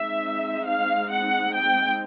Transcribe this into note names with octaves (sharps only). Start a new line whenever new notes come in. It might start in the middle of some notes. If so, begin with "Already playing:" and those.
Already playing: G#3 C4 D#4 E5
F5
F#5
G5